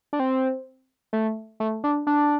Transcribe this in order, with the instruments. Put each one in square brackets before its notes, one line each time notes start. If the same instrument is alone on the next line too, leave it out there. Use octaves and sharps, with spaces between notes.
[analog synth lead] D4
C4
A3
A3
D4
D4